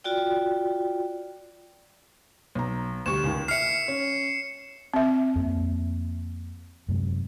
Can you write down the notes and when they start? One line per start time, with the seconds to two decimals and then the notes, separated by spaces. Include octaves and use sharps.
0.04 F4 F#4 D5 G5
2.55 B1 A#5
3.06 D2 G3 C#6 E7
3.23 C#2 D#3
3.48 E5 F6 C7 C#7
3.88 C#4
4.94 C4 E5
5.36 F2 A#3
6.88 F#2 C3 G#3